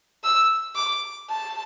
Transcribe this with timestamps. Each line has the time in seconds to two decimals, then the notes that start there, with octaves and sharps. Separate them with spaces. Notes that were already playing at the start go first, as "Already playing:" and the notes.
0.24 E6
0.76 D6
1.29 A5